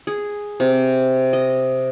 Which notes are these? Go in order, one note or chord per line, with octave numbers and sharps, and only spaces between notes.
G#4
C3
D#5